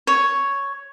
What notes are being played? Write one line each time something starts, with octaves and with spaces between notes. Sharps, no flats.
C#5